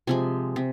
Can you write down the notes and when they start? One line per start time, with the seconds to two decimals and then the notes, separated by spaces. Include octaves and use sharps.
0.07 C3 F3 G#3 G#5
0.56 C3